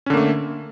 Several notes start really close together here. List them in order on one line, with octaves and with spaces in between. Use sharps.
C#4 D3 A#3 A3